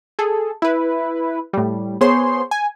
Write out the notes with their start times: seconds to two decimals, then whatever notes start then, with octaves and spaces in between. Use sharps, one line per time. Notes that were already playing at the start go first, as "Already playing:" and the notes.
0.19 G#4 A4
0.62 E4 B4
1.53 A2 G3
2.01 B3 G#4 C5 C#5 C6
2.51 G#5